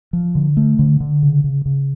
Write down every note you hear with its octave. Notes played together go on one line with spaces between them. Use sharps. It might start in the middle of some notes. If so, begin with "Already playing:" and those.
F3
D3
A3
D3
D3
C#3
C#3
C#3